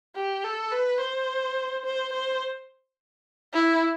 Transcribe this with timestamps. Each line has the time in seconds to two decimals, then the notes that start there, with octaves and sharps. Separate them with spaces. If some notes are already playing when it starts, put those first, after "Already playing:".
0.15 G4
0.44 A4
0.72 B4
1.01 C5
1.85 C5
2.13 C5
3.54 E4